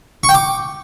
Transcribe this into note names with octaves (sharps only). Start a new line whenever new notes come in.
C#6
G5
D6